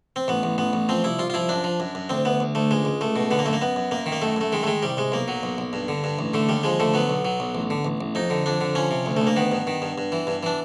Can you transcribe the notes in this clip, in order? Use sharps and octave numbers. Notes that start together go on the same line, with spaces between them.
C4
A1 B3
A1
A1 B3
A1
F3 C4
C2 E4
C2 F4
F4
F3 E4
F#2 D4
F3
F#2
F#2
D2 C4
D2 B3
D2
D2 A3
C#2 G#3
C#2
C#2 A3
B2
D3 B3
A#3
F#2 A3
A#3
F#2 B3
F#2
F#2 A#3
D#3
A#3
F#2 A3
F#2 A3
D#3 G#3
A3
D#3 G#3
C2 G3
C2 G#3
B1 A#3
F#3
B1
B1
G2
D3
G2
A1
D3 A3
D#2 G3
F3 G#3
D3 A3
F#3 B3
B1
F#3
B1
A1
D3
A1
A1
F2 D#4
D3
F2 D4
D3
F3 C#4
C3
D2
D2 A3
A#3
D#3 B3
G2
D#3
G2
G2
E3
G2
E3 D4